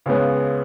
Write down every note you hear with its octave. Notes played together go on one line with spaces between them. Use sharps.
C#2 C#3 G#3 B3